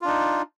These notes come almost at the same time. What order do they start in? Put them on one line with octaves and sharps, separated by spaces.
F4 D4 D#4